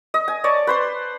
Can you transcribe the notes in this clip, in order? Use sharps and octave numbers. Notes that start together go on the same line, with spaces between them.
D#5
G#5
C#5 D5 A5
B4 C5 C6